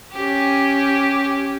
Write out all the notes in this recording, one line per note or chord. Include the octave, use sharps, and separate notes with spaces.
C#4 G4